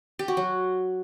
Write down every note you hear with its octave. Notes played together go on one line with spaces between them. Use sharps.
G4
F#4
F#3